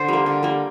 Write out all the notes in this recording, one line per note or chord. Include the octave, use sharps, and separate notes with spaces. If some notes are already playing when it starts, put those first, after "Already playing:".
Already playing: D3 C5
G3 A#3
D3
G3 A#3